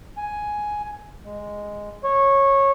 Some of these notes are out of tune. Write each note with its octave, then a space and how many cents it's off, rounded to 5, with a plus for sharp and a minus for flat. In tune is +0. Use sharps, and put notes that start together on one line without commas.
G#5 +5
G#3 -5
C#5 -15